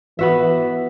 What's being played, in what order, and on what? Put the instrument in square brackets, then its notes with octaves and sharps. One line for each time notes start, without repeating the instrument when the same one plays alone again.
[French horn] E3 [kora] B3 F#4 E5